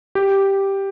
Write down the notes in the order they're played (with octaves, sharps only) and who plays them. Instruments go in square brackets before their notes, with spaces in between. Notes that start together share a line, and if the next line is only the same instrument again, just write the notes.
[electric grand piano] G4